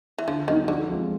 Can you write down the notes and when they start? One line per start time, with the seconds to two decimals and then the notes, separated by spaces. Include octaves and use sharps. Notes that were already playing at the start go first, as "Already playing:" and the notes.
0.18 E3
0.28 D3 F3
0.48 D#3 F#3 B3 D#4
0.68 D3 F3
0.89 G#3 C4 F4